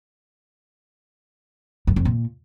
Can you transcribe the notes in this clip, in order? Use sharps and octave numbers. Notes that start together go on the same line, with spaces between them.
F#2
F2
A#2